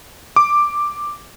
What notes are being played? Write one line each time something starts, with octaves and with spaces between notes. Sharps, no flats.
D6